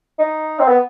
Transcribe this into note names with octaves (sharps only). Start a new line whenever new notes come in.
D#4
C4
B3